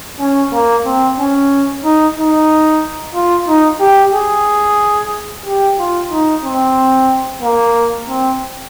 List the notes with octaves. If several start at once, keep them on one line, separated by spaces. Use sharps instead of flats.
C#4
A#3
C4
C#4
D#4
D#4
F4
D#4
G4
G#4
G4
F4
D#4
C4
A#3
C4